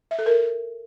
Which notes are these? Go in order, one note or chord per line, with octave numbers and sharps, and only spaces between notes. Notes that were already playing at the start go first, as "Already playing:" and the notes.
E5
A4
A#4